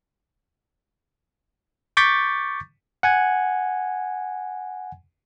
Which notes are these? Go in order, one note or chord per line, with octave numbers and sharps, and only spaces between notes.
C#6 D6 G6 A6 B6
F#5 G#5 G#6